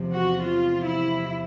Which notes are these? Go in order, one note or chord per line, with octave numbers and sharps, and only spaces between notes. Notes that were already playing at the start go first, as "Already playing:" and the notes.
Already playing: E2 C3 F3
F#4
F4
E4